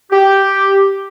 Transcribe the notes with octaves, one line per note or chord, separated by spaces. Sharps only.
G4